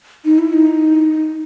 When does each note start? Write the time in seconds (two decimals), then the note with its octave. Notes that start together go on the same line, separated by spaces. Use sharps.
0.25 D#4
0.38 E4
0.53 D#4